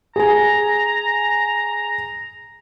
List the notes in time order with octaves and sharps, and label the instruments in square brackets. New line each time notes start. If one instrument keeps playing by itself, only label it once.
[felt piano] G#4 G#5 [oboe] A#5